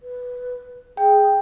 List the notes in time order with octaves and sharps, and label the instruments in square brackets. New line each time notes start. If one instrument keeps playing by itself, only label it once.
[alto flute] B4
[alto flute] G#4 [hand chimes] G5